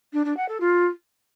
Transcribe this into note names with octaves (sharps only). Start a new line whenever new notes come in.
D4
D4
F#5
A4
F4